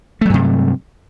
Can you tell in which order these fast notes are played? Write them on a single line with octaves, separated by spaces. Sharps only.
A3 F#3 G2 C3